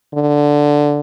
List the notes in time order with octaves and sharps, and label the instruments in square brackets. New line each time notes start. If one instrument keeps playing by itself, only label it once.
[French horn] D3